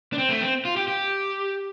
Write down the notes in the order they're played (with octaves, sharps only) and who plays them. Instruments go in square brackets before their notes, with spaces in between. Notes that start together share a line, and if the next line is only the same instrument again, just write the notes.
[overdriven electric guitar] D4
C4
A3
C4
F4
G4
G4